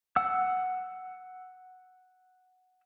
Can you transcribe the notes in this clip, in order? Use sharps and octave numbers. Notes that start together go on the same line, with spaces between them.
F#5 E6